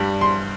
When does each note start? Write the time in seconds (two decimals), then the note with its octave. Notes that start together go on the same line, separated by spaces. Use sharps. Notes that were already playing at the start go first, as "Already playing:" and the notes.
Already playing: G2 G3
0.21 C6